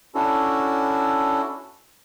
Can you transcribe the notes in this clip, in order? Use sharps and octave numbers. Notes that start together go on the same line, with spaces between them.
C#4 D4 E4 F#4 A4